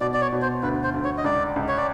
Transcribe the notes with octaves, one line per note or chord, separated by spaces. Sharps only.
B2 D5
D5
C#5
B2
C5
D2 B4
C5
D2
C#5
D#5
C#2 D5
C#2
C#5
D5